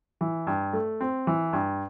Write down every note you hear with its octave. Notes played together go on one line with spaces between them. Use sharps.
E3
G2
A3
C4
E3
G2